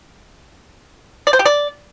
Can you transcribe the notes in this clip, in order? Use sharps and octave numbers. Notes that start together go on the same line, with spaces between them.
D5
C5
G4
D5